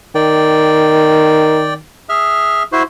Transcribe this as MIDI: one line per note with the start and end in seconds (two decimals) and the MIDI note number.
0.15 1.81 51
0.15 1.74 74
0.15 1.74 79
2.09 2.63 68
2.09 2.63 76
2.09 2.63 89
2.72 2.83 64
2.72 2.83 66
2.72 2.83 72